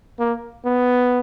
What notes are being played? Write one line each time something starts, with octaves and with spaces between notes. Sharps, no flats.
A#3
B3